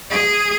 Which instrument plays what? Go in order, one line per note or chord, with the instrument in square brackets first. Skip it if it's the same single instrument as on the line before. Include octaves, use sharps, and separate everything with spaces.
[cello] G#4